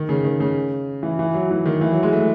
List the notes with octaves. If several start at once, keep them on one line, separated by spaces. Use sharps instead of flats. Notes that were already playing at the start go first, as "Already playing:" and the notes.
Already playing: D#3
C#3
D#3
C#3
E3
E3
F#3
E3
D#3
E3
F#3
G#3
A3